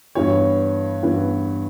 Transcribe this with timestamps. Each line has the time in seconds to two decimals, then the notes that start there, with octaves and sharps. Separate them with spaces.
0.15 G2 E3 B3 C#5
1.03 G2 E3 B3